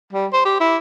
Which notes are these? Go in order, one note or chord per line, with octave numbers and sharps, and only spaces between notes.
G3
C5
G4
E4